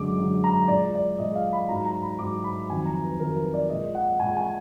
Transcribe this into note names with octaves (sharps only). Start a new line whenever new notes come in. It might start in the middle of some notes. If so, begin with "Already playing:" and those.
Already playing: F#2 D3 G#3 D6
F#2 D3 G#3
A#5
A#2 G#3 D5
D5
A#2 G#3 D#5
F5
B5
G#2 F#3 A#5
A#5
B5
G#2 F#3 D6
B5
F2 D#3 F#3 G#5
A#5
B4
F2 D#3 F#3 A#4
B4
D5
A#2 G#3 D#5
F#5
A#2 G#3 G#5
G#5